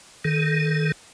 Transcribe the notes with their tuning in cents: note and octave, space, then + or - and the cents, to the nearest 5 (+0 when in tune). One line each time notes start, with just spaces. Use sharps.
D#3 +0 A4 -35